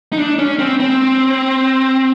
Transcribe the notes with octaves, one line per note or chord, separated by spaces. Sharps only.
D#4
D4
C#4
C4
C4